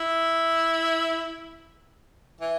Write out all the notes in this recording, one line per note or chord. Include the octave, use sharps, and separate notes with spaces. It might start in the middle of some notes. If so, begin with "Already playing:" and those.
Already playing: E4
E3